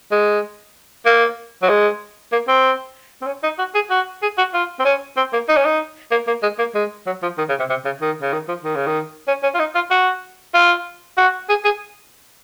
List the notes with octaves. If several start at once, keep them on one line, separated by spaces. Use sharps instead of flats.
G#3
A#3
F#3
G#3
A#3
C4
C4
C#4
D#4
F#4
G#4
F#4
G#4
F#4
F4
C4
C#4
C4
A#3
D#4
C#4
D#4
A#3
A#3
G#3
A#3
G#3
F#3
F3
D#3
C#3
C3
C3
C#3
D#3
C#3
D#3
F3
D#3
C#3
D#3
C#4
C#4
F4
D#4
F4
F#4
F4
F#4
G#4
G#4